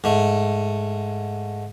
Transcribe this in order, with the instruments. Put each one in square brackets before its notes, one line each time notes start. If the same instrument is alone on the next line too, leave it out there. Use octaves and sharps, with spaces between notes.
[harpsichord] G#2 A3